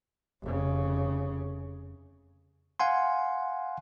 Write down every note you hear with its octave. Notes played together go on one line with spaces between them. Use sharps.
F1 C#3
F5 F#5 G#5 C6